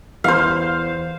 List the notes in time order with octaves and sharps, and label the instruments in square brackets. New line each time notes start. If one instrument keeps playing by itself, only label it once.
[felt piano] E2 [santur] C5 F5 [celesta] C6 F6